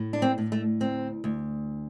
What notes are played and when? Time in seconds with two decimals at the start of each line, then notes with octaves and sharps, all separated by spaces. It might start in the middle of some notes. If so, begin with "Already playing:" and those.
Already playing: A2
0.13 D4
0.22 C4
0.38 A2
0.52 A3
0.80 D2 C4
1.24 D2